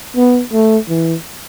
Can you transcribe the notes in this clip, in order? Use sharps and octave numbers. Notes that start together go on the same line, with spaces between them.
B3
A3
E3